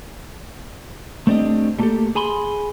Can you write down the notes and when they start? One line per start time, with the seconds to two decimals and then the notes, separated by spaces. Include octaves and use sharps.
1.27 A3 C4 D4 G4 D#5
1.79 G3 A3 A#3 F4 G4 A4
2.15 G#4 G#5 B5 C6